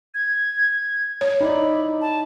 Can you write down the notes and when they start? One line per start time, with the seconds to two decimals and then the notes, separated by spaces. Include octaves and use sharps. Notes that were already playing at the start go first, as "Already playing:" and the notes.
0.14 G#6
1.21 C#5
1.41 D#4 E4 D5 B5
2.01 A5